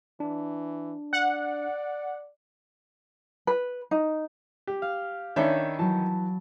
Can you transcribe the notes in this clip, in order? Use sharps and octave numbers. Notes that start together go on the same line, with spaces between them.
E3 D4
D5 F#5
B4
D#4
G4
F5
D#3 C#4 D4 C#5 E5 B5 G6 C#7
E3 F#3 A5